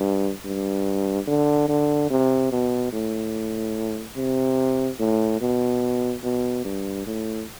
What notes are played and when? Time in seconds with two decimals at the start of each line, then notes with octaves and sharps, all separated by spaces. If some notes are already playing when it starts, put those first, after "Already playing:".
Already playing: G2
0.45 G2
1.27 D3
1.68 D3
2.10 C3
2.52 B2
2.93 A2
4.17 C3
4.99 A2
5.41 B2
6.23 B2
6.65 G2
7.07 A2